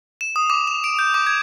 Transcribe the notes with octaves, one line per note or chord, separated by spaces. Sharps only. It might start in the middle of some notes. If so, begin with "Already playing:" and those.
E7
D#6
D6
F7
D7
G6
D6
G#6